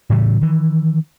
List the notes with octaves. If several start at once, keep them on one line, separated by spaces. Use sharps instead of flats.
A2 C#3 E3 G3
D#3 E3